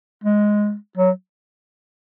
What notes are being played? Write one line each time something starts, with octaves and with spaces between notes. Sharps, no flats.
G#3
F#3